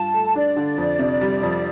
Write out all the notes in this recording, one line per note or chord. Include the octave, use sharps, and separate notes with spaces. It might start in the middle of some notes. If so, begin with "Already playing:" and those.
Already playing: G2 F4 A5
A3
D4 D5
D3
F2
C3
G3
F2